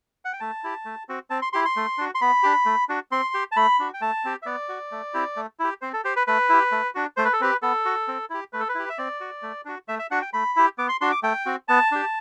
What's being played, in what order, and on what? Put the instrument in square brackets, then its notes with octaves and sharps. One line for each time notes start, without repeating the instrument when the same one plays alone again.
[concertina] F#5
G5
A3 A5
E4 G4
A3
C4 F#4
C4 A5
C6
E4 G4 C6
C6
A3
D4 F#4
C6
B3 B5
D4 G4
A3
D4 F#4
C4 C6
G4
A5
A3 B5
D4 F#4
G5
A3 A5
C4 G4
E5
B3 D5
F#4
A3
C4 E4 G4
A3
E4 G4
C4 C5
A4
G4 C5
B4
A3 B4
E4 G4
A3
D4 F#4
A3 C5
B4
A4
C4 G4 B4
B3 A4
F#4
C4
E4 G4
A3 B4
A4
B4
E4 G4
E5
C4 D5
F#4
A3
D4 F#4
A3 E5
E5
D4 F#4 F#5
G5
A3 B5
E4 G4
B3 D6
C6
D4 F#4 C6
D6
A3 G5
C4 F#4
B3 A5
D4 G4